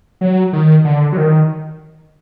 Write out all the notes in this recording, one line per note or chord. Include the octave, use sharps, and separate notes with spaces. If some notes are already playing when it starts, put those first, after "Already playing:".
F#3
D#3
D3
F#3
D#3